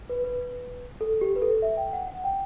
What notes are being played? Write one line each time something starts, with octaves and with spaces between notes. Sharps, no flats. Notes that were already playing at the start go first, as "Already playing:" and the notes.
B4
B4
A4
G4
B4
A4
E5
G5
F#5
F#5
G5